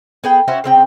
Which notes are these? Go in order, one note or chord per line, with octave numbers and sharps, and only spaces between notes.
B3 G#4 G5
C#4 E4 F#4 C5
C#3 C4 G5